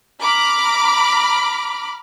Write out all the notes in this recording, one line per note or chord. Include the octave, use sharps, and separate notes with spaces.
A#5 B5 D6 F6